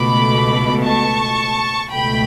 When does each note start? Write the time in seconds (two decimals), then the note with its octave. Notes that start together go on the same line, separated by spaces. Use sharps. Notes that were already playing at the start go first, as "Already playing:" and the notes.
Already playing: C#2 B2 A3 B5 D6
0.83 A5 C#6
1.92 C#2 B2 A3 G5 B5